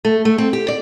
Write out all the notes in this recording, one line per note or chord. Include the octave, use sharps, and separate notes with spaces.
A3
A3
C4
G4
D5